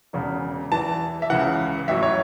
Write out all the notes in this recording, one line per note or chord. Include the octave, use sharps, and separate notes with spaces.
E1 E2 C#3
E2 E3 A5
E5
C#2 C#3 E3 F#5
A1 A2 F#3 E5
C#5